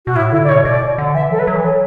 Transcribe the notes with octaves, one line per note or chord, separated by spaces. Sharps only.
B2 F#4
A2 E4
D3 E4
D5
B2 C#5
B2 D5
D3
E3 E5
F#3 A4
B4
F#3
E3
F#3 A4